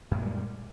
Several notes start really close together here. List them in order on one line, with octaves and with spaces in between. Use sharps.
F#2 A#2 G#3 G3